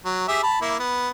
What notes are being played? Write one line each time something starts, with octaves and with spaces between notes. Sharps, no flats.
F#3
G4 G#4 E5
A5 B5
A#3 E4
B3